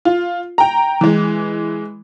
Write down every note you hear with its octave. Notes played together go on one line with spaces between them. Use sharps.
F4
G5 A#5
E3 G#3